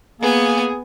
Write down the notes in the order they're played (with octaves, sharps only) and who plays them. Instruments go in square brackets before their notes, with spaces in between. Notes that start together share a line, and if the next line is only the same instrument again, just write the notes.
[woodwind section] A#3 [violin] B3 G#5 [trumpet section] G#4